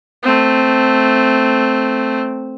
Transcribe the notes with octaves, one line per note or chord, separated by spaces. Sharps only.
A3 C4